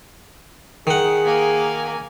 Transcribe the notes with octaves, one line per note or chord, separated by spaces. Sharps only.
D#3 G#4 F#5
A#3 G#5